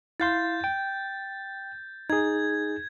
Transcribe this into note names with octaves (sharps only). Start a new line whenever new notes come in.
E4 F5 C6 G6 A6
G5
D#4 G#4 G#6